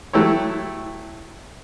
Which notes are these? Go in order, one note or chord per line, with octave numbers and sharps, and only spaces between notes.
F#3 A3 E4 G4 C#5